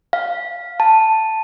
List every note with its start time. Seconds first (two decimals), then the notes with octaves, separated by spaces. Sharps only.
0.13 F5
0.80 A5